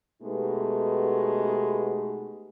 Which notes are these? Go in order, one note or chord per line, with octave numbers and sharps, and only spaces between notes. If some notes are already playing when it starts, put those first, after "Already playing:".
B2 G#3 A3 B3 D#4 G4